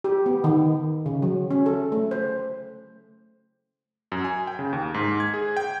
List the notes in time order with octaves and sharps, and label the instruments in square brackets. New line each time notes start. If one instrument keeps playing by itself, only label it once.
[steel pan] G4
B3
D#3
C#3
F#3
C#4
A4
A3
C5
[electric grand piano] F#2
G#5
G5
C#3
D#2
G#2
G#6
G#4
G5